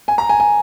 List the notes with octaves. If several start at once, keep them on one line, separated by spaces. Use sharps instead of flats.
G#5
A#5
G#5
G#5